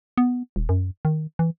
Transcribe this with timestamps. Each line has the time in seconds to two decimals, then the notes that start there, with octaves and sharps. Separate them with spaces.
0.18 B3
0.56 D#1
0.69 F#2
1.05 D#3
1.39 E3